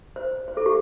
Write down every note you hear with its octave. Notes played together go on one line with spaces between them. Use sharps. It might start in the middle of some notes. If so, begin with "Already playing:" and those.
C5
C5
A4
G4